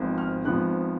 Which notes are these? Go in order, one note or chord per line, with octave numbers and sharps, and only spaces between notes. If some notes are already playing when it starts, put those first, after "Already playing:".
Already playing: G#1 G#2 F3 B3
F6
G#1 G#2 F3 B3 F#6